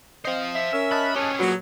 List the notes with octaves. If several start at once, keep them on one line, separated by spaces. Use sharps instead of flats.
C4 C5 D#5 F5
E5
C#4 A#4 E6
D#5 A5 B5 F#6
C#4 G4 G#4
A#2 F#3 B4